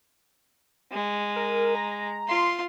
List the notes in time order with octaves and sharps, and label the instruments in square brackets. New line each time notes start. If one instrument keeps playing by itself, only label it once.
[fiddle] G#3
[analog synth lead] A#4
A#5
[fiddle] F4 C6